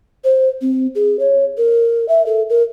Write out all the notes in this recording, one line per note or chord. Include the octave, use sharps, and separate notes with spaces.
C5
C4
G#4
C#5
A#4
E5
A4
A#4